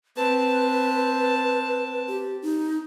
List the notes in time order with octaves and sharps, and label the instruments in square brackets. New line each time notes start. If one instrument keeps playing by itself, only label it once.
[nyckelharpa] C4 A5 [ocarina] B4
[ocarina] G4
D#4